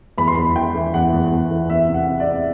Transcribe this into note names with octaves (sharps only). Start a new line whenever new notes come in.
E2 B5
C6
E2 B5
E2 G5
E3
E2 F#5
E2
E2
E3
E2 E5
C3
F#5
C3
D5
C3